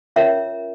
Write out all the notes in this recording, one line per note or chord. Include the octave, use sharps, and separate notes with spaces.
C#4 F4 A#4 C#5 E5